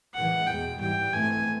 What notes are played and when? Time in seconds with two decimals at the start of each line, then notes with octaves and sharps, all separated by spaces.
0.14 A2 E3 G#3 F#5
0.47 E2 B2 G#3 G5
0.80 G#2 E3 G3 G5
1.13 G#2 E3 A3 C4 G#5